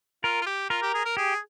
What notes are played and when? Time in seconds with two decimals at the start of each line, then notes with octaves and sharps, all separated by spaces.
0.24 F4 A#4
0.42 F4
0.46 G4
0.70 F4 A#4
0.82 G4
0.94 G#4
1.05 A#4
1.17 G4 G#4